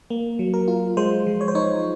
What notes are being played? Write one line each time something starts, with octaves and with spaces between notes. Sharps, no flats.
A#3
F#3
A#4
F4
G#3 C5
F3
C#5
C5
D#4 C#5